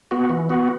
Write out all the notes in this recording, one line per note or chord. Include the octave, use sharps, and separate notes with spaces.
B3 F#4
E3
B3 F#4